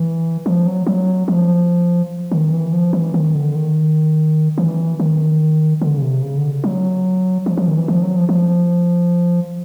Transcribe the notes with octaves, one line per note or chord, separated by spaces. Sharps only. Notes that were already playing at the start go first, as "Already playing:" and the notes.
Already playing: E3
F3
F#3
F#3
F3
D#3
E3
F3
E3
D#3
D3
D#3
E3
D#3
D3
C#3
C3
C#3
D3
F#3
F3
F3
D#3
E3
F3
F#3
F3
F3